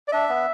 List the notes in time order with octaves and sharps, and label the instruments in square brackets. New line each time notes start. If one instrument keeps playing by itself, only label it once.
[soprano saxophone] D5
[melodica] D4 [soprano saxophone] E5
[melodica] B3